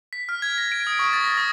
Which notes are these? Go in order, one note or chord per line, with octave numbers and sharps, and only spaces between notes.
B6
F6
G#6
A#6
D7
D#6
C#6
A6
A#6
D#6